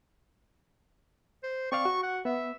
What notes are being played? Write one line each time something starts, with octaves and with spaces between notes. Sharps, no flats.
C5
C4 D5 F5 C#6
F#4
F#5
B3 E5